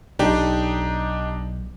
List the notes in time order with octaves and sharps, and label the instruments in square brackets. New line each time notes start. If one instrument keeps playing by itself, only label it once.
[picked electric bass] B1 [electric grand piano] D4 D#4 G4